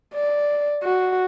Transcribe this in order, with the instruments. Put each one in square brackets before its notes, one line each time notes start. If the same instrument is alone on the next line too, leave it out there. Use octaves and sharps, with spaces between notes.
[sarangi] D5
F#4